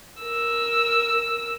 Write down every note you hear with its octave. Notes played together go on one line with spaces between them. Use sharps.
A#4 E6